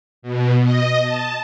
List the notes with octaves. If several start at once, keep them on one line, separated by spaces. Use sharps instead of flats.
B2
D#5
A5